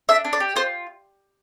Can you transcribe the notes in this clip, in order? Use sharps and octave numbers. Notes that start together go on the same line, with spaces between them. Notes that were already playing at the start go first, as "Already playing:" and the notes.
D4 E5
D4
D5
G4
F4 C5